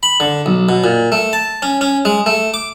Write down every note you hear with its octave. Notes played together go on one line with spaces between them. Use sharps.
B5
D3
B1
B2
A#2
A3
A5
C#4
C#4
G#3
A3
D6